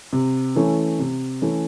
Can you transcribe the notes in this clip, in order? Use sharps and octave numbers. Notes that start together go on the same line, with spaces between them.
C3
E3 A3 C#4
C3
E3 A3 C#4